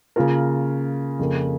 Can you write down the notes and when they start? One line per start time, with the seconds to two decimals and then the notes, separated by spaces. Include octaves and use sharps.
0.16 C#3 A#3 F4 A#4
1.19 F2 C#3 A#3